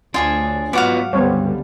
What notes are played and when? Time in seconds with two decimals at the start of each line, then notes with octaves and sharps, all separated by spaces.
0.14 D2 D4 F4 G#4 C#5
0.73 G#2 F#3 B3 F4 F#4 F5 F#5 D6
1.13 C#2 G2 D3 G3 B3 C4 C#5